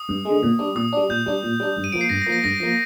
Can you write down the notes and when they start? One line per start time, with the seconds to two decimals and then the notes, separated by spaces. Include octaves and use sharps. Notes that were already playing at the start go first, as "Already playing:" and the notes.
Already playing: D#6
0.09 G2
0.25 D3 G#3
0.43 A#2
0.59 G3 D4
0.75 A#2 D#6
0.93 G3 D4
1.09 A#2 G6
1.26 G3 D4
1.43 A#2
1.60 G3 D4
1.77 G2
1.84 D#7
1.92 F3 A#3 D7
2.01 C7
2.09 G2 A#6
2.22 A#6
2.26 F3 A#3
2.32 A#6
2.44 G2 A#6
2.60 F3 A#3